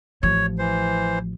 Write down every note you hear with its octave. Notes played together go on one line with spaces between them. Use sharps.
A1 F3 C#5
E3 C5